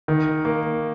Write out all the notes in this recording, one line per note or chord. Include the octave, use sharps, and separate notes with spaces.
D#3
A#3